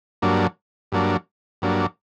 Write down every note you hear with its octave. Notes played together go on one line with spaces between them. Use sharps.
G2 F#3 A#3 D4
G2 F#3 A#3 D4
G2 F#3 A#3 D4